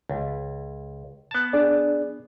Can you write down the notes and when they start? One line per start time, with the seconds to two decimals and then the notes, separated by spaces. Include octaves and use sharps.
0.10 C#2
1.31 B3 A5
1.53 D4 G#4 D5